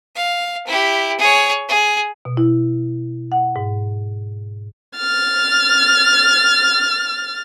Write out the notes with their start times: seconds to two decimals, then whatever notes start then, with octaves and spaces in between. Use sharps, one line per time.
0.16 F5
0.67 E4 G4
1.19 G#4 C#5
1.69 G#4
2.25 B2
2.37 E4
3.32 F#5
3.56 G#2
4.97 F6 A6